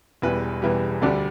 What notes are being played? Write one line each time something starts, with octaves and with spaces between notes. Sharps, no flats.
E1 E2 E3 G3 B4
E1 E2 E3 G3
D2 D3 G3 A4 D5